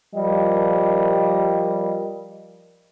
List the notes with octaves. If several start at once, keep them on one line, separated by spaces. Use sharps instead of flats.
F3 G3 A#4 D#5